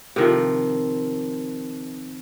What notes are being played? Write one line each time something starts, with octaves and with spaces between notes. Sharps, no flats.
C3 D#3 F3